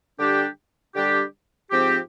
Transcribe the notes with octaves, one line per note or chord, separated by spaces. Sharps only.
D3 G3 D4 G4
D3 G3 D4 G4
G#2 F3 C4 G4